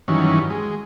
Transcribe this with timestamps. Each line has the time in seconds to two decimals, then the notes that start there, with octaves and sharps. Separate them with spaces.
0.08 G2 D#3 E3 F#3 C#4
0.50 G#3